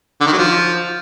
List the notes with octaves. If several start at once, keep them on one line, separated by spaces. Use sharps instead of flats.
D3
D#3
F#3
F3